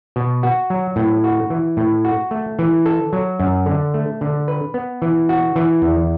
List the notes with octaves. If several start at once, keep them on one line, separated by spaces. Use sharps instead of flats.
B2
F#4
F#3
A2
F#4
E3
A2
F#4
A3
E3
A4
F#3
F#2
D3
A3
D3
B4
B3
E3
F#4
E3
E2